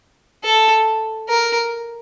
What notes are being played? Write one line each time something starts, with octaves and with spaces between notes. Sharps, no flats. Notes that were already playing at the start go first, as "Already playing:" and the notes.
A4
A#4